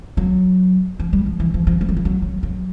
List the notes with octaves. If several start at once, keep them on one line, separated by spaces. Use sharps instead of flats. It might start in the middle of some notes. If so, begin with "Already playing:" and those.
F#3
F3
G3
F3
E3
F3
F3
G3
F#3
F3
F#3
F#3
F#3